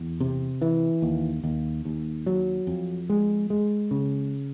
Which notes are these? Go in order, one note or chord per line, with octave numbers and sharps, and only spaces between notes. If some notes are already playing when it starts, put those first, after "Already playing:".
Already playing: E2
C3
E3
D#2
D#2
D#2
F#3
F2
G#3
G#3
C#3